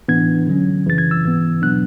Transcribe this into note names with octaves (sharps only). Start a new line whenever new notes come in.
A2 E3 B3 D4 G#6
D3 F#3 C#4
F#2 C#3 E3 A6
G#6
E6
G#2 E3 B3
B2 F#3 B3 D4 F#6